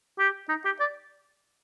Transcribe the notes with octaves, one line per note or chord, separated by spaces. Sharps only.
G4
D#4
G4
D5